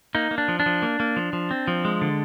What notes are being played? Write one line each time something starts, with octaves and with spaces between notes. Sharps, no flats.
A#3 D#4
A#3
D4
F3
D4
F3
A#3
A#3
F3
F3
C4
F3
G#3
D3